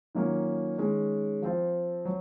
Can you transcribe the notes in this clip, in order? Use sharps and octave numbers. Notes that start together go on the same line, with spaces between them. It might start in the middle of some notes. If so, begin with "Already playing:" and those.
D#3 F#3 A#3 C#4 F4
D#3 G#3 C#4
F3 C4 F4
F#3